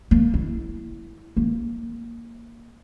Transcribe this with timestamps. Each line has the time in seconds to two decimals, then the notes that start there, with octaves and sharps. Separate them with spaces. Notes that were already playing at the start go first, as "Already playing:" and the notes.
0.11 A#3
0.34 E4
1.37 A#3